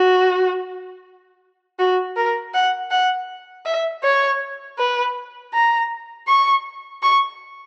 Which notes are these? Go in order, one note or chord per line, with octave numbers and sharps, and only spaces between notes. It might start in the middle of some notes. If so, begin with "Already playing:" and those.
Already playing: F#4
F#4
A#4
F#5
F#5
E5
C#5
B4
A#5
C#6
C#6